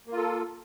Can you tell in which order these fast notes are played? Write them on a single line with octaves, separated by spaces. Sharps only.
A#3 F4 A4